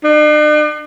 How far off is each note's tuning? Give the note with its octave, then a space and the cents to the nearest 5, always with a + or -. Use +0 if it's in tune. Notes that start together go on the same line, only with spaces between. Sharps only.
D4 +45